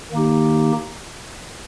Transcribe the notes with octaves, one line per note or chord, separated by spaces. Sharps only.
D#3 A#3 D#4 G4